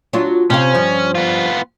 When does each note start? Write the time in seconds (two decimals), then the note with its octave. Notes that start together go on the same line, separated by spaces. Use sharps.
0.13 F#3 D4 F4
0.50 C3 C4 C#4 F5
0.74 G2 F3
1.15 B3 F4